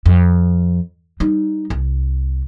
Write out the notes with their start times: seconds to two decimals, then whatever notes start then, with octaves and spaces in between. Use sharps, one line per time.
0.06 F2
1.20 G3 D#4
1.70 C2